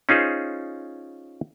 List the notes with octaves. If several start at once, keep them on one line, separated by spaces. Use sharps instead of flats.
C#4 D#4 F4 G#4 C5